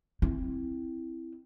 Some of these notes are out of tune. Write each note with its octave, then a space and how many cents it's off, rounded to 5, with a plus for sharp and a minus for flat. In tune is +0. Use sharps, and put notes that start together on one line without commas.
C4 +0 E4 +0